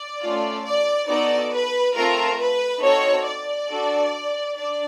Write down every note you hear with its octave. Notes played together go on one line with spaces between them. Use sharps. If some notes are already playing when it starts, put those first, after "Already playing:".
Already playing: D5
A3 C#4 F4
D5
B3 D#4 F#4 A4 D5
B4
A3 C4 F4 A4 A#4
B4
C4 D#4 F#4 A4 C#5
D5
D4 F#4 A4
D4 D5